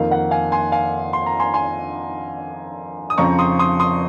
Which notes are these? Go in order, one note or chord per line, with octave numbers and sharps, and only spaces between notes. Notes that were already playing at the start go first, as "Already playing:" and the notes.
Already playing: F2 D#3 A#3 F5
F#5
F5 G#5
G#5 C6
F5 G#5
C6
A#5
G#5 C6
G#5 C6
D#6
F2 C#3 F3 C4 A#5 C#6
C6 D#6
C6 D#6
C6 D#6